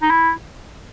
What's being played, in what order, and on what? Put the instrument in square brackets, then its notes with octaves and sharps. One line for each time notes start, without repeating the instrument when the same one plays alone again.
[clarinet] D#4
E4